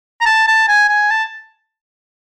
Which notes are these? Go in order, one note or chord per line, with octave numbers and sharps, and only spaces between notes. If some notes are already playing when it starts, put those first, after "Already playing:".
A#5
A5
A5
G#5
G#5
A5